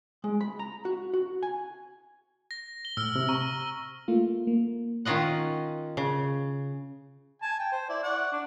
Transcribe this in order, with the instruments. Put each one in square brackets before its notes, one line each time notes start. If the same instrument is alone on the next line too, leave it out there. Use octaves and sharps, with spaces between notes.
[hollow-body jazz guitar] G#3
B5
A#5
F#4
F#4
G#5
[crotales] A#6
G7
[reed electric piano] A2 [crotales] E6 F6
[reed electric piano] C3
[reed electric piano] A#5 [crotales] C#6
[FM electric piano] A3 A#3 F4
A#3
[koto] D#3 C#4 F4 D#5 F#5
C#3
[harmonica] G#5 A5
G5
C5
E4 D5
D5 F#5 C#6
D4